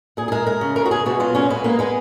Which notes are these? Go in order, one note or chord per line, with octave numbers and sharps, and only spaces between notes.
A#2 G#4
G#4
G#3 A#4
G#3 A#4
C#3
G#3 A#4
F#4
G#3 G#4
B2 F#4
F#3 F4
A#2 C#4
G#3 B3
G#3 A#3
G#3 B3